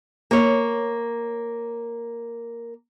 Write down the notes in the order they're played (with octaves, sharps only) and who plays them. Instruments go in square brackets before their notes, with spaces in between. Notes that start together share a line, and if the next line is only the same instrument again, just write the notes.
[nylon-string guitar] A#3 C#5